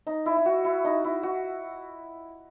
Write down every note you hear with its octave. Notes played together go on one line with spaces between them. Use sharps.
D#4
E4
E4
F#4
E4
D#4
E4
F#4